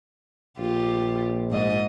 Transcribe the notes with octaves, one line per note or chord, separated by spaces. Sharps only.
A#1 F4 G4
G#2 D#5